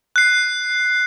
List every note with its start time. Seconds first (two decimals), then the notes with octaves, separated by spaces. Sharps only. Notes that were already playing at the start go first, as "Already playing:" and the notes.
0.16 F#6 C7